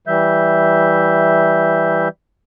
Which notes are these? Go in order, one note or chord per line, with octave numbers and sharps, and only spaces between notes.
E3 G3 E5 G6